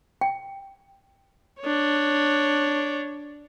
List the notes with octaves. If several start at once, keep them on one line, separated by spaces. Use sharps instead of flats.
G5
D4 C#5